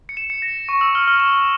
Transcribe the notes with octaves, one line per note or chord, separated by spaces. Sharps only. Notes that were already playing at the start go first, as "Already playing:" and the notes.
C#7
E7
C#7
A#6
C#6
E6
F6
F6
E7